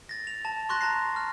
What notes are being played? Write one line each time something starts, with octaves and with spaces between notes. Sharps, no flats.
A6 A#6
F7
A5
C6 C#6 F#6 A#6
A5 A#5 A#6 C7
F6